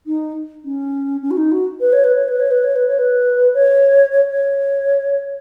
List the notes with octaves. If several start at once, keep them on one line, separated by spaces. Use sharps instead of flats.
D#4
C#4
C#4
F#4
D#4
F#4
B4
C#5
B4
C#5
B4
C#5
B4
C#5
B4
C#5
B4
C#5
C#5
C#5